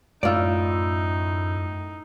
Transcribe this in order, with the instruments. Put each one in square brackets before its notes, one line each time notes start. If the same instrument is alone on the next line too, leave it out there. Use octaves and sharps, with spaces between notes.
[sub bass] F#2 [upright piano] A2 E6 [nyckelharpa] D#4 [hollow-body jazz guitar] F4 D5